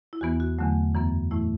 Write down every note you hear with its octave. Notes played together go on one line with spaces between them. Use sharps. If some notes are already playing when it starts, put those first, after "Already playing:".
E4
E2 E3 B3 F#4
F#4
E2 D3 F#3 A3
F#2 E3 B3
A2 E3 A3 E4